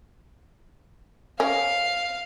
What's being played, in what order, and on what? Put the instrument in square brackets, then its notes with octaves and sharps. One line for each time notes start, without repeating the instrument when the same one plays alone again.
[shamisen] C#4 A#4 [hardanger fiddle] F5